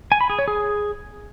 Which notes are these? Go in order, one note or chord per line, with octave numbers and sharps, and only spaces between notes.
G#5
B5
G#4
C#5
G#4